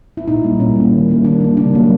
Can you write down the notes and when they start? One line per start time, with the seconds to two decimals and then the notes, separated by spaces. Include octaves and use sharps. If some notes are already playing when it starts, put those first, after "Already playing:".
0.17 E4
0.28 A#2 D#4
0.44 G3 A#3
0.60 A#2 C#4
0.76 G3 A#3
0.92 D#3
1.09 G3 A#3
1.24 D#3 D4
1.40 G3 A#3
1.57 C#3 D4
1.74 F#3 A#3